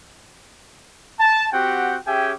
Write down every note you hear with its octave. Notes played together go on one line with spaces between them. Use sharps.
A5
C4 F#4 G4 F#5 G5
C#4 G4 G#4 E5 G5 G#5